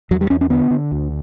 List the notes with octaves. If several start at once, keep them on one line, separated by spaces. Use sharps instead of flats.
E2 F#3
G3
E2 C#4
C#4
D3 B3
D3
D2